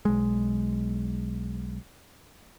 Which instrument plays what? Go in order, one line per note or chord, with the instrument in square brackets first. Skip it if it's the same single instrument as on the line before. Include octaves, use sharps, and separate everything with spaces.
[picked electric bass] B1 G#3